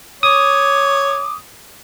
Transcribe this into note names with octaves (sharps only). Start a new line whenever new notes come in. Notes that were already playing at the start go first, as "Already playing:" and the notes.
C#5 D6 D#6